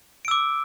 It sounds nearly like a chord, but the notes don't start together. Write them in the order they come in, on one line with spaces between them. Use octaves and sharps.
D7 E6 D6